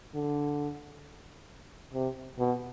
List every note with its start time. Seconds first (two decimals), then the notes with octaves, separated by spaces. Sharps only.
0.14 D3
1.94 C3
2.39 B2